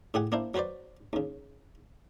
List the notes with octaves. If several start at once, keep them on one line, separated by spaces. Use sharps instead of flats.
A2 G4 G#4 F#5
A#3 D4 E4 C5
F#3 F#4 B4 C5 D5
D#2 C#3